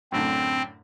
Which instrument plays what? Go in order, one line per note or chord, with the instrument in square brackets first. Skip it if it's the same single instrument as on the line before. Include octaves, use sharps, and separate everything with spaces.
[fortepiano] F#2 A2 D3 [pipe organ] C4